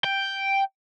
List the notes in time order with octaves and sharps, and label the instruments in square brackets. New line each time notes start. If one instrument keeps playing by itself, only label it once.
[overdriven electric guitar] G5